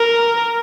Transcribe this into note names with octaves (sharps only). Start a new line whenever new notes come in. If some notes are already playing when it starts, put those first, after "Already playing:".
Already playing: A#4